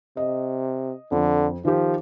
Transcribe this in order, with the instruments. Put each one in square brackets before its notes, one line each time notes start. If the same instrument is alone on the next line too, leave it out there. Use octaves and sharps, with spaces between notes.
[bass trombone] C3 [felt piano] D#5
[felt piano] F2 [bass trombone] D3
[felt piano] D#3 G4 [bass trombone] F3